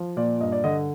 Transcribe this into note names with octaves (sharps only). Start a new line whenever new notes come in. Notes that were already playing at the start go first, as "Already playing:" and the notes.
Already playing: F3
A#2 D5
G2 D#5
D5
D3 D#5